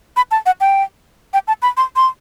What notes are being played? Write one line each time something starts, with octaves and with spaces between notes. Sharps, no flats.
B5
A5
F#5
G5
G5
A5
B5
C6
C6